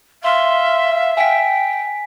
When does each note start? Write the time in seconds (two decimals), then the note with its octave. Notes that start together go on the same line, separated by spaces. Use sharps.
0.23 E5 F5 C6
1.17 G5 G#5 B6